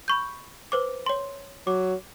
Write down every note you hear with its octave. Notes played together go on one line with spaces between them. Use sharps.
B5 C#6 G6
B4 C5 D6
C#5 C6
F#3 D6